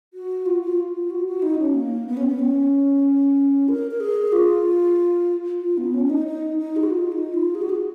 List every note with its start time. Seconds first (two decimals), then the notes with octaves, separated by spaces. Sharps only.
0.14 F#4
0.46 F4
0.62 F4
0.94 F4
1.10 F#4
1.26 F#4
1.42 D#4
1.59 C#4
1.74 A#3
2.07 B3
2.17 C#4
2.27 B3
2.39 C#4
3.68 A#4
3.91 A#4
4.00 G#4
4.32 F4
5.61 F4
5.78 B3
5.94 C#4
6.05 C#4
6.10 D#4
6.26 D#4
6.58 D#4
6.76 G#4
6.83 F#4
6.90 F4
7.12 D#4
7.34 F4
7.55 G#4
7.62 F#4
7.69 G#4